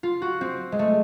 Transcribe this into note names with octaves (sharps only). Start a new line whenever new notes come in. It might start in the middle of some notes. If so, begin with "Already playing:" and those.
F4
F#4
C4
G#3
A3